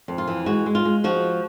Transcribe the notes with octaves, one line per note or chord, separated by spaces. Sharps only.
F2
F4
E3
G#3 F#4
G#3
F4
G#3
F3 F#4